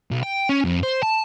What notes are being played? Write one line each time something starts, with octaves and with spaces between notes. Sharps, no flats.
B1
G5
C#4
F2
C5
A5